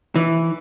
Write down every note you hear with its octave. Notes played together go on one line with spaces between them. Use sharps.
E3